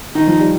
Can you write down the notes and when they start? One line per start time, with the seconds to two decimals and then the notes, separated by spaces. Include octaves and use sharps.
0.15 D#3 D#4
0.27 F3
0.39 G3